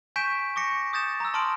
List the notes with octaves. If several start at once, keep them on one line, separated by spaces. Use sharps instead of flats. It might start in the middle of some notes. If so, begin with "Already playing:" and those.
G#5 C#6 G6 B6 D7 E7
C#6 D6 A#6 C#7
D#6 G6 A6 E7
A#5 E6
A5 C6 D#6 F6 D7 F#7